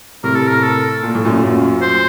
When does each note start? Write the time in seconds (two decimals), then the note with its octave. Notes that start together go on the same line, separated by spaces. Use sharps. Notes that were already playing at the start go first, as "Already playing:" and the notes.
0.24 A2 C3 A#4
0.35 A4
0.48 A#4
0.63 A4
1.03 A#2
1.15 A2
1.25 F#2 A#2
1.43 F#2 A#2
1.82 C5